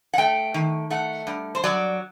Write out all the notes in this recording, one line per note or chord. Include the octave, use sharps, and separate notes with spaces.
F#5
A3 G5
D#3
A3 F#5
G2
C5
F#3 D5